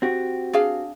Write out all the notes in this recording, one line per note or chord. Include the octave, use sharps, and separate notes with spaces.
C4 F#4 G4
D4 G#4 F5